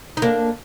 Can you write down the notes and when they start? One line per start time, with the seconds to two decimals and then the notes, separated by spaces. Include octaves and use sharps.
0.17 D#4
0.22 A#3 D4